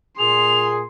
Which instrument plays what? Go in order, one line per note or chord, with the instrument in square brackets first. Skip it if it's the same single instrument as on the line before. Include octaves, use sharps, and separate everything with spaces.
[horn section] A#2 G#4 [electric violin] C6 [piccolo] F7